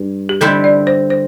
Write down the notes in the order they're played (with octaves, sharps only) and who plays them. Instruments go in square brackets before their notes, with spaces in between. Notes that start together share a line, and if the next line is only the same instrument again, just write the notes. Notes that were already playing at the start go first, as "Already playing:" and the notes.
Already playing: [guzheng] G2
[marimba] G4
[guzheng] D3 G3 C4 E4 [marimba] A4
[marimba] D5
C5
C5